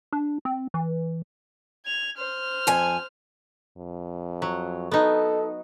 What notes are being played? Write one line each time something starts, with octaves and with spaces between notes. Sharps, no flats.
D4
C4
E3
G#6 F7
C5 F6
F2 G#5
F2
F#3
B3 D#4 A4